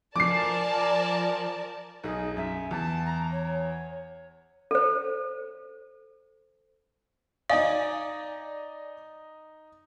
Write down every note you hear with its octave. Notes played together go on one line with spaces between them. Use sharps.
F3 A#4 D5 G#5 A5 D6 C7
B1 D#4 G#4
F#2 E5
E2 A5
A#5
C#5
A4 C5
D#4 D5 D#5 F5 G#5